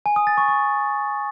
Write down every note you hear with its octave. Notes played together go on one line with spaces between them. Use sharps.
G#5
D#6
A6
C#6
C#6